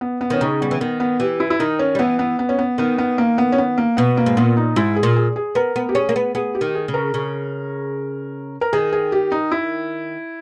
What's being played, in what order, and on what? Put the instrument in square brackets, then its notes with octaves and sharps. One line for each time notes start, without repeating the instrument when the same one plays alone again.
[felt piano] B3
B3
[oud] D#3 [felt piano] C#4
[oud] C#3 [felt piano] D#4
[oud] G3 [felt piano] B3
[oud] E3
[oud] D#3 [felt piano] B3
[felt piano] B3
[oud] E3 [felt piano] G4
[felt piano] E4
E4
[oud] D#3 [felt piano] D#4
[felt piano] C#4
[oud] G3
[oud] E3 [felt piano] B3
[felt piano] B3
B3
C#4
B3
[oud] D#3 [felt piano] B3
[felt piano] B3
A#3
B3
C#4
B3
A#3
[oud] B2 [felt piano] B3
[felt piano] A#3
[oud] G#2
[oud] A#2 [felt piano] B3
[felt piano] D#4
[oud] G#2 [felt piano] E4
[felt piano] G#4
[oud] A#2
[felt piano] G#4
G#4
[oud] B3 [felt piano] A#4
[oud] B3
[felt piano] G4
[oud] C#4 [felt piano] G#4
[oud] A#3
B3
[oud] B3 [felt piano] G#4
[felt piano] G4
[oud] D#3
[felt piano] G#4
[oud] C#3
[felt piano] A#4
[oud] C#3
[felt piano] A#4
[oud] D#3 [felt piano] G#4
[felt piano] G#4
G4
D#4
E4